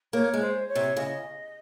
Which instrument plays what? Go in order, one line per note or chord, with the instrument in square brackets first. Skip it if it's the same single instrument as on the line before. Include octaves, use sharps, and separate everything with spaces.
[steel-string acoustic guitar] A#3 [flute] C#5
[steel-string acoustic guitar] G#3
[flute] C5
C#5
[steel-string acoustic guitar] C3
[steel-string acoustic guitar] C#3 [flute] D#5